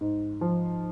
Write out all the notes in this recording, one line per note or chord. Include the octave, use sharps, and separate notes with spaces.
G#2
F3